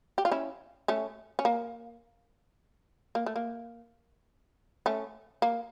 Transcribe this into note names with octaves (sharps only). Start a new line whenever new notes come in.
G4
F4
C#4 E4
A3 C#4
C#4
A#3
A#3
A3
A#3
A3 C#4
A#3